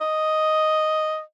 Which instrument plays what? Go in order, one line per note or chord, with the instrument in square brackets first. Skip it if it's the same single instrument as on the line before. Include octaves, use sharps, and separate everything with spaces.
[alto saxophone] D#5